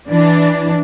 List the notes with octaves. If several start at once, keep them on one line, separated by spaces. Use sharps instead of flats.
E3 D4